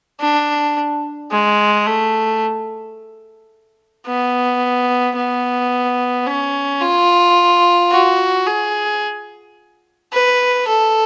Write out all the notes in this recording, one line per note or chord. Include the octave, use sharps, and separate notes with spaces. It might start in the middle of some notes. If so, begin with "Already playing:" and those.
D4
G#3
A3
B3
B3
C#4
F4
F#4
G#4
B4
A4